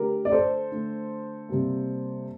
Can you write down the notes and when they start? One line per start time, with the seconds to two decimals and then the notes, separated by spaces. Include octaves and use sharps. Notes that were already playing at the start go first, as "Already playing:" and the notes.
Already playing: D3 A3 G4 A#4
0.25 D5
0.32 A4 C5
0.71 D3 A3
1.49 C3 G3 A#3